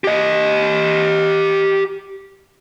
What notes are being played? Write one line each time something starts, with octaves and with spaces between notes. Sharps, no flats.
G4 D#5